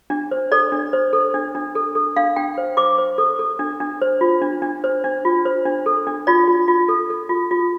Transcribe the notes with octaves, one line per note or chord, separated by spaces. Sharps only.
D4
C5
A4 D5
D4
C5
A4
D4
D4
A4
A4
D4 F5
D4 G5
C5
C5 D6
C5
A4
A4
D4
D4
C5
F4
D4
D4
C5
D4
F4
C5
D4
A4
D4
F4 D5
F4
F4
A4
A4
F4
F4